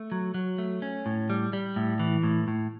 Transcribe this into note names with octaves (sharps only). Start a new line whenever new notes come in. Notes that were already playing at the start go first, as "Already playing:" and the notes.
Already playing: A3
F#3
F#3
A3
C#4
A2
G3
G3
A2
E3
A2
A2